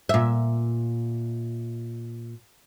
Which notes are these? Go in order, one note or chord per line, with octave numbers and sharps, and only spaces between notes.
A#2 E5